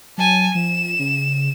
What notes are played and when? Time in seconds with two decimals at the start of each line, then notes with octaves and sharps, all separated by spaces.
0.18 F#3 G#5 A5
0.55 F3 E7
0.99 C#3